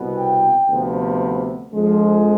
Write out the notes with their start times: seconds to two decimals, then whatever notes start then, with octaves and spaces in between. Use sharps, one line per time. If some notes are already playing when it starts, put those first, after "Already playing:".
Already playing: C2 B2 B3
0.17 G5
0.69 D2 C3 F3 B3
1.72 F2 D3 F3 G#3